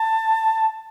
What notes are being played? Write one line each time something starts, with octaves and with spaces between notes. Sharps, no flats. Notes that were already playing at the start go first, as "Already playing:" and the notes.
Already playing: A5